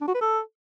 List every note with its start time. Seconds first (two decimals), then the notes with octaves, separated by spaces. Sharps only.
0.01 D4
0.08 F#4
0.15 B4
0.21 A4